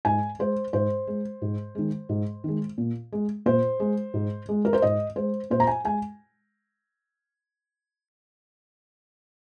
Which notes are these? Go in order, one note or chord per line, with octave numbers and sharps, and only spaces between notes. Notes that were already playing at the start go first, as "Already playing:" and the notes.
G#2 G#5
G#3 C5
G#2 C5
G#3
G#2
D#3 G#3
G#2
D#3 G#3
A#2
G#3
A#2 C5
G#3
G#2
G#3
A#4
C5
G#2 D#5
G#3 C5
A#2 C5
A#5
G#5
G#3 G#5